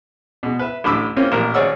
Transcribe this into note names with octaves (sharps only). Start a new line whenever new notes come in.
B2 G#3
B4 E5
A1 A2 D3 B5 D6 E6
C3 A#3 C4 C#4 F4
A1 A#2 A#4
G#1 G#4 C#5 D5 F#5 E6